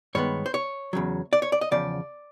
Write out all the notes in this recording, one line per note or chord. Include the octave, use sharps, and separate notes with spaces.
G2 D#3 G#3 B3 C#5
C5
C#5
E2 C#3 F#3
D5
C#5
D5
D#5
E2 C#3 F3 D5